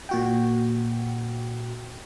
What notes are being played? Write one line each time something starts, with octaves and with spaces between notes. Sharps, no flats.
A#2 F#4 G5